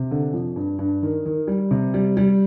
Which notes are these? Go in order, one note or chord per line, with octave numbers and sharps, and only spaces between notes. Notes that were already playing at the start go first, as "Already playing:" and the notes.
Already playing: C3
D3
F2
G2
G2
D#3
D#3
G3
C3
G3
G3